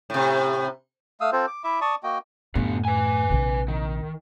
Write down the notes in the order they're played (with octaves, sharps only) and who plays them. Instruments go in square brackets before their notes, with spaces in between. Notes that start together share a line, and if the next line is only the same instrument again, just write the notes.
[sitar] A2 C3
[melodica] A3 F5 D#6 E6
C4 F4 A4 C5
D6
E4 E5 D6
D5 A5 C#6 D#6
A#3 F#4 D#5 G5
[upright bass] F#2 A2 [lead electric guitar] D3 B3
[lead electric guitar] B4 G#5
[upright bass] A#1 C3
[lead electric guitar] D#3